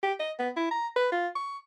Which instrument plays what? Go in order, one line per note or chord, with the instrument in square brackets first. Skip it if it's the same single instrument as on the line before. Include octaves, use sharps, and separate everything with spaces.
[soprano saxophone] G4
D#5
B3
E4
A#5
B4
F4
C#6